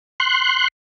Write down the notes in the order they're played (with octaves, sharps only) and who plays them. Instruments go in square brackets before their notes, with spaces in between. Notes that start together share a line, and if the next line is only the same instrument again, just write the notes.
[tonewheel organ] C6 F#6